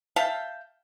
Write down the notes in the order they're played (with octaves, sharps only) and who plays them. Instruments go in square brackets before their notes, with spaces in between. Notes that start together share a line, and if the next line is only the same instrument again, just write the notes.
[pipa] E5 F5 G5 A5